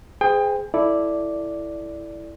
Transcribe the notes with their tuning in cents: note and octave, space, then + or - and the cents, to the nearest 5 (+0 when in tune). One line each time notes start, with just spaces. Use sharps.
G#4 +0 C5 -35 G5 +25
E4 +0 A4 +0 D5 +0